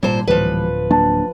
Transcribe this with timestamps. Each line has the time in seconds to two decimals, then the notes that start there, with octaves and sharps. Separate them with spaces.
0.03 G#1 A#2 G3 A#3 C5 A5
0.28 D1 A#2 E3 F3 G3 B4
0.91 F#3 A#3 D4 A5